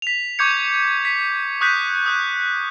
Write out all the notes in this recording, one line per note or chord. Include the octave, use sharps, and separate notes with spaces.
B6 F7
C#6 D6 G6 G#6 C#7
B6
C#6 D#6 F#6 G6 B6
D#6 F#6 G6